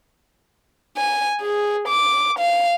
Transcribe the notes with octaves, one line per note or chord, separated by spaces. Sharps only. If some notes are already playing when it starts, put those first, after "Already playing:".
G#5
G#4
D6
F5